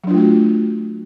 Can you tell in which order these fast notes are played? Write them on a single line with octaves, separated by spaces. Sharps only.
F#3 D4 F4 A3 F#4